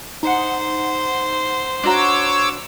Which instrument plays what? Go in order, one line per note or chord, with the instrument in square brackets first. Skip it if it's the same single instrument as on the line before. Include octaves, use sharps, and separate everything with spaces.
[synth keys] D#4 F#5 [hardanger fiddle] C5
[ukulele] D4 F#4 A#5 [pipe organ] C#5 D6 E6